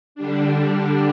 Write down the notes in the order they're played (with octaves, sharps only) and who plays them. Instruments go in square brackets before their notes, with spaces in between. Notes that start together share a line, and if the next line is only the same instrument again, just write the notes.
[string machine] D3 G3 D4